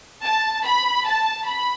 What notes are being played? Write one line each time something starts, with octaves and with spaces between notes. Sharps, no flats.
A5
B5
A5
B5